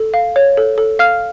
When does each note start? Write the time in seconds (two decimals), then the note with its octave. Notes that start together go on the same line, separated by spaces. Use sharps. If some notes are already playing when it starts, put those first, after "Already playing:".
Already playing: A4
0.14 F5
0.36 C#5
0.57 A4
0.78 A4
0.99 F5 F6